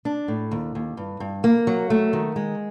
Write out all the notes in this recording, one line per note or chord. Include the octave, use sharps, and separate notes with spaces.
D4
A2
D#2
D#2
G2
G2
A#3
F#3
A3
D#3
G#3